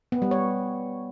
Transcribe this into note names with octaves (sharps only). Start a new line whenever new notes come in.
B3
G3
C#5